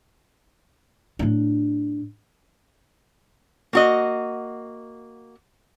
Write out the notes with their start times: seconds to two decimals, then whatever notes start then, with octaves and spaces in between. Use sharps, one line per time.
1.19 A2 D4
3.73 A#3 F#4 D#5